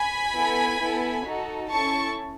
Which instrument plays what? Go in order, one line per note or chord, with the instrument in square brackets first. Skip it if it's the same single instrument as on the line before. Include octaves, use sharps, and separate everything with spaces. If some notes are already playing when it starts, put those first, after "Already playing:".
Already playing: [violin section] G#5 B5
B3 E4 A4
B3 E4 A4
D#4 F#4 A4
C#4 E4 A4 A5 C#6